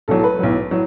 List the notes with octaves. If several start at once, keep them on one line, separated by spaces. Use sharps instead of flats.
B1 A2 F#3 A4
A4
B4
B1 A2 F#3
A2 F#3